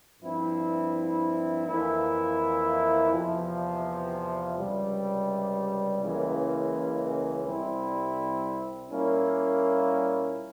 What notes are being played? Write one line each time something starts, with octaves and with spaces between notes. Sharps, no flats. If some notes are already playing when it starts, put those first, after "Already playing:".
G2 F3 C4 E4
F2 E3 A#3 E4
E2 C3 F3
C#2 C3 G3
C#2 C#3 E3 A#3
C2 C3 G3 C4 E4
A#2 G3 A#3 C#4 E4